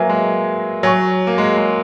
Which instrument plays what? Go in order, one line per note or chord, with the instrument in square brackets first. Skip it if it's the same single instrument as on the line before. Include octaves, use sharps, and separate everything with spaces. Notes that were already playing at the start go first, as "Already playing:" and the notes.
Already playing: [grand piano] F#3 A#3 [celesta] B4 E5 G#5
[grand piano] G#3
[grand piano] F#3 [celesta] C#5 G#5 C#6
[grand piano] A#3
G#3
G#3